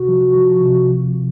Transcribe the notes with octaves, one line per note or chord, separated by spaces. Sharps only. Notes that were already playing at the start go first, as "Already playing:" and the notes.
Already playing: C3 F#4
F3
F3
C3